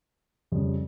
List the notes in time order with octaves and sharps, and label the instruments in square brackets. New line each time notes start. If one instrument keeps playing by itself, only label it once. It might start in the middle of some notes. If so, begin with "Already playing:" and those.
[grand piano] F2 C#3 G3